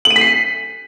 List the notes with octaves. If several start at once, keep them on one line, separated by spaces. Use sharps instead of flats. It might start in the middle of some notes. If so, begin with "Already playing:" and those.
F#7
D#7
B6
C7